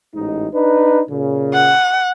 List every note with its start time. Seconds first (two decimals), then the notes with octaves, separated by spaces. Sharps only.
0.15 A1 G#2 D#4
0.53 D4 D#4 B4
1.10 A#2 C#3
1.54 F#5